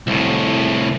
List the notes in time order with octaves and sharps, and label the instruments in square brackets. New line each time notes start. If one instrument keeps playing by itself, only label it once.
[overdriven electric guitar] C2 A2